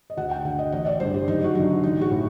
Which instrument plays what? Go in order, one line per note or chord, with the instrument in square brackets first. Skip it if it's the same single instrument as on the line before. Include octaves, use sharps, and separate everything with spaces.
[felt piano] D#5
D2 F#5
G5
D3 F#5
D#5
A1 D#5
D5
G2 D3 C5
G4
F#1 D#4
F#4
F#2 D3 D#4
A1 D#4
F#4
A2